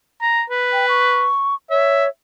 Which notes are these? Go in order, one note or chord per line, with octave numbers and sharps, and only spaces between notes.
A#5
B4
G5
C#6
C#5 E5